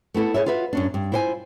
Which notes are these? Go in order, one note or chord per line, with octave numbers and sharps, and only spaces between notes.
A3 B3 E4 A4
G#4 A4 C#5 E5
F4 F#4 B4 E5 F#5
F#2 C#4 D4
G2
E4 F4 C5 D#5 G#5